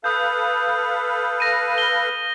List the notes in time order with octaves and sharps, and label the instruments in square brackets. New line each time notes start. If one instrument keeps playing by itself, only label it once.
[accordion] A4 B4 F5 [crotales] D#6 G6
[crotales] A#6 D#7
G7